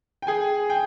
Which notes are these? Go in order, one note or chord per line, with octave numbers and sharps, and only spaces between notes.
G5
G#4 G#5
G5